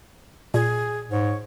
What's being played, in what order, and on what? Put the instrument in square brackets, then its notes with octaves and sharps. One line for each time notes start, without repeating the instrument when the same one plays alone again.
[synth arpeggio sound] A#2 [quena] G#4
[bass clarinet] G#2 [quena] C#5